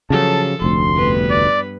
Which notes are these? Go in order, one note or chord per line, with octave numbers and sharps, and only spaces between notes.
C#3 F3 F#3 A4 A5
F1 D2 C6
G2 B3 B4
D5